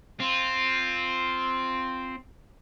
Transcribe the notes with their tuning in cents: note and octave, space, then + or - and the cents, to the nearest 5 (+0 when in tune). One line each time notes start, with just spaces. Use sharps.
C4 +0 F4 +0